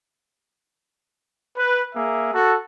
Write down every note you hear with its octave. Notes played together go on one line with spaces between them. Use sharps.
B4
A#3 G#4 E5
F#4 A4